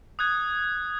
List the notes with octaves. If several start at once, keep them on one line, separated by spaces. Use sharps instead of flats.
D#6 F#6 G#6